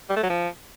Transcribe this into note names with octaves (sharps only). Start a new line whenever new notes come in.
G3
A3
F#3
F3